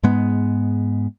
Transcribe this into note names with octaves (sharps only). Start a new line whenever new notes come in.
G#2 G#3 B3